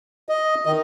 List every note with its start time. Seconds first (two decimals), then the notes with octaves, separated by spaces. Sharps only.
0.29 D#5
0.65 D#3 D#5